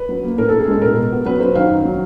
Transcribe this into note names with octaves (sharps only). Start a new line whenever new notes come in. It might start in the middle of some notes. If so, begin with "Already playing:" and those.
Already playing: B4
F#3
A#3
A2 A#4
A2 A4
G#4
G#3 A4
B2 A#4
B2
B3
F#3 B4
F#3 C5
D#3 F5
F#2
F#3